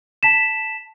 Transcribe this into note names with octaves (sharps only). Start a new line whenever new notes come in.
A5 B6 E7